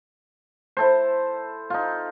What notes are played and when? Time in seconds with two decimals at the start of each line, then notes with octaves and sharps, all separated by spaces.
0.77 E4 A4 C5
1.70 D#4 F4